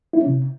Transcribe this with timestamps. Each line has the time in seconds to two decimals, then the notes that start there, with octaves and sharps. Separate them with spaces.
0.13 E4
0.20 C#4
0.26 C3